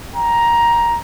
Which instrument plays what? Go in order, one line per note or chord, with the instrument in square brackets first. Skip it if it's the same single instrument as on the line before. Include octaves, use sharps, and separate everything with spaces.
[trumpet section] G5 A#5